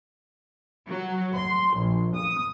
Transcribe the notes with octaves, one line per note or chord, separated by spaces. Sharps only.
F#3
C6
A#1
D#6